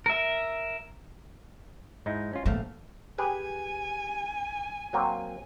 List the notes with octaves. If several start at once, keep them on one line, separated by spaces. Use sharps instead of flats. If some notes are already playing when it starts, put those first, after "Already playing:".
A#4 E5
G#2 D#4 E4
C#4 F4
A#1 A3 B3 F5
G4 G#4 B4 G#5
F#3 A#3 C4